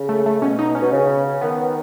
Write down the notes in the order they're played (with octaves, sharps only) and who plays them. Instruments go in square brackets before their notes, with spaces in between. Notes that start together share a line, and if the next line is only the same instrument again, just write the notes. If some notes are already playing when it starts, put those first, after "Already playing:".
Already playing: [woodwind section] C#3
[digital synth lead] A3
A3
[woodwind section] B2 [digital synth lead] C#4
[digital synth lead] D#4
C#4
[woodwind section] B2
C#3
[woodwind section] D#3 [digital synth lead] B3